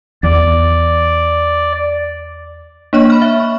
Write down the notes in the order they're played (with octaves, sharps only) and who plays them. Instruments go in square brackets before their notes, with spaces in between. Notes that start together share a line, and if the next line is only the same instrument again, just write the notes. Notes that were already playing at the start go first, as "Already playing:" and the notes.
[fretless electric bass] E2 [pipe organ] D5
[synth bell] A#3 D4 C#5 C#6 F#6
B5 F6
E5
C#6